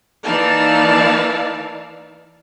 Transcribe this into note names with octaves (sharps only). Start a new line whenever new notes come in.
E3 A#3 D#4 D5 F5 A5